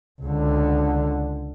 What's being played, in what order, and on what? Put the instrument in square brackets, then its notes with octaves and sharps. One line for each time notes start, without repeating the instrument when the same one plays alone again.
[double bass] C#2 D3